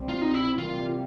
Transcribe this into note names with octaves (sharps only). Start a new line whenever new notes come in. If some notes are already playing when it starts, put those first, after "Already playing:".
Already playing: C2 B2 G3 C4
F4
D#4
E4
C3 E3 G3 A#3 F4